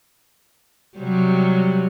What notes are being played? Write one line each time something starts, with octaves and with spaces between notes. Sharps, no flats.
C3 F#3 G3